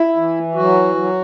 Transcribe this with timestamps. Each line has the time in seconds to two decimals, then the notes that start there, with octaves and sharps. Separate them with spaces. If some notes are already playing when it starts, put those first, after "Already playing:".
Already playing: E4
0.16 E3
0.55 F#3 F#4
0.95 F#3